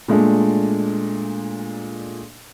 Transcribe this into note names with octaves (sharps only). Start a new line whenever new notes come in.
A#2 G#3 A3 D4